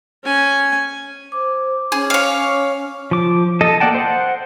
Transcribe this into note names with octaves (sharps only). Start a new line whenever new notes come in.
C#4 G#5
C5 D6
C#4 G#4
C#5 F5
F3 D6
A4 D#5 A5
A#3 D5 F#5 G5 A5
C5 F#5